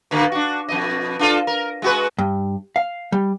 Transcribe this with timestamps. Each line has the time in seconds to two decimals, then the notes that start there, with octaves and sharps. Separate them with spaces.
0.11 B2 D3 A#3
0.32 D4 F#4
0.68 F2 B2 D#5
1.19 D4 F4 A4
1.47 A#4
1.82 G#3 F#4 B4
2.18 G2
2.76 F5
3.12 G3